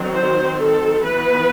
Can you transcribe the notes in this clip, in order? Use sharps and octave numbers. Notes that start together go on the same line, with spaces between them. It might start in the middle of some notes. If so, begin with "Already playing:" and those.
Already playing: D#3 F#3 C4
C5
A4
E3 B3 B4